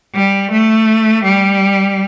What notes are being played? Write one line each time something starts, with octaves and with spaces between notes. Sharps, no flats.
G3
A3
G3